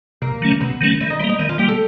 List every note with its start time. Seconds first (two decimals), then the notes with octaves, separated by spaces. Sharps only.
0.22 C3 A#3
0.42 D#3 F#3 A3 C#4
0.61 C3 B3
0.81 D#3 F#3 A3 C#4
1.01 D#3 E4
1.10 D#4
1.20 G3 E4
1.24 A#3
1.29 D#4
1.39 D#3 E4
1.49 F4
1.58 G3 A#3 G4
1.68 A4